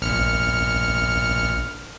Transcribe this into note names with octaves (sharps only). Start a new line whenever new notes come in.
A#1 F6 C#7